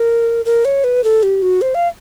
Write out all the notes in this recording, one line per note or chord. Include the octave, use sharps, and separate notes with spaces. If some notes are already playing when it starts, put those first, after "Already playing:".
Already playing: A#4
A#4
C#5
B4
A4
G4
F#4
C5
F5